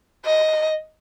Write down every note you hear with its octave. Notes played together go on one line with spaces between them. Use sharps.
D#5